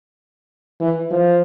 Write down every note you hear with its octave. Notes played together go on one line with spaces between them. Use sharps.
E3
F3